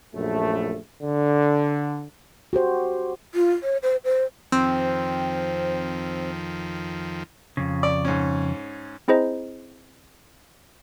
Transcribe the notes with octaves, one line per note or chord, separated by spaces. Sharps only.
A#1 F#2 A3
D3
F#4 G4 C5
F4
C#5
C5
C5
F2 D#3 F3 C4
F2 C#3
D5
G#2 C#4
C4 E4 G#4 C5 D#5 A#5